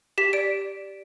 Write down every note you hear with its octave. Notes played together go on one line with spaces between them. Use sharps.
G4 B6
D5 D7